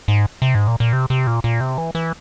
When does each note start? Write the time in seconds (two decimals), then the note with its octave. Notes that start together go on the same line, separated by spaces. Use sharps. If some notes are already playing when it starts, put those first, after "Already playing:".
0.08 G#2
0.42 C3
0.55 G#2
0.68 A#2
0.80 A#2
0.93 C3
1.10 C3
1.27 A#2
1.44 A#2
1.61 C3
1.78 E3
1.95 E3